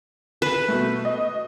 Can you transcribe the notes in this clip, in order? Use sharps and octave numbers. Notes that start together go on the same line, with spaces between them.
B4
B2 A3
D#5